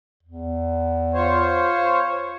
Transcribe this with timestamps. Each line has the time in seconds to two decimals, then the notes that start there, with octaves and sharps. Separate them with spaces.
0.23 E2
1.14 F4 C5 C#5